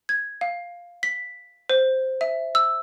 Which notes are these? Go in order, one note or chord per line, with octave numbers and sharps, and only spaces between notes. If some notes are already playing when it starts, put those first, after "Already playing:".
G#6
F5
B6
C5
E5
E6